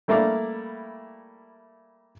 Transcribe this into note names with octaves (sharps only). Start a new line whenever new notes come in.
G3 A3 A#3 E4 D5 F5